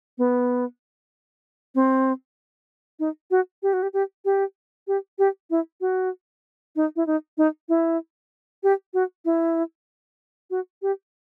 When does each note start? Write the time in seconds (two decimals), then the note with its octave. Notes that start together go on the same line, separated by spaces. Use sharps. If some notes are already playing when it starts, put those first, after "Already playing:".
0.18 B3
1.75 C4
2.99 D#4
3.31 F#4
3.63 G4
3.73 F#4
3.83 G4
3.93 G4
4.25 G4
4.87 G4
5.19 G4
5.50 E4
5.81 F#4
6.76 D#4
6.96 E4
7.07 D#4
7.38 D#4
7.69 E4
8.63 G4
8.94 F#4
9.25 E4
10.50 F#4
10.82 G4